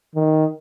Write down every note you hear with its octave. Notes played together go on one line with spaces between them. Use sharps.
D#3